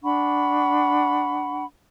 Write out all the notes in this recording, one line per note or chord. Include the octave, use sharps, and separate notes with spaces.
D4 F#5 B5 C#6